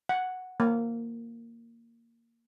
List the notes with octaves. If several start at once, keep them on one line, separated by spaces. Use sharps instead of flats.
F#5
A#3